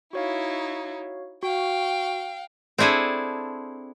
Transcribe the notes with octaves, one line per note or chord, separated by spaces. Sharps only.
D#4 E4 F#4 C#5 F5
F#4 F5 G5
C4 D4 E4 G#4 A4